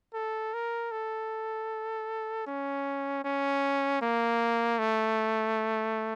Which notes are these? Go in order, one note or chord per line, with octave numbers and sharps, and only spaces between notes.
A4
A#4
A4
C#4
C#4
A#3
A3